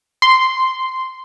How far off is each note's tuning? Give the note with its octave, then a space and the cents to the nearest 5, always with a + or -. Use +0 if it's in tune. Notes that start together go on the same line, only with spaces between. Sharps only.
C6 -10